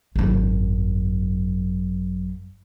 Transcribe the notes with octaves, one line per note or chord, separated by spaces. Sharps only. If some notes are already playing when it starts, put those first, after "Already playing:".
G#1 F#2